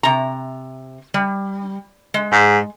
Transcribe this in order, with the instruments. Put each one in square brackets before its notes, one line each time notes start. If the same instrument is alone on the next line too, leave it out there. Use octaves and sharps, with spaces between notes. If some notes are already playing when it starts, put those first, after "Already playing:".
[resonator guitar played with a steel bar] C3 A#5
G3
G#3
[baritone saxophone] G#2